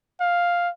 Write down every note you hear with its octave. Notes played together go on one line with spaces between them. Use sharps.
F5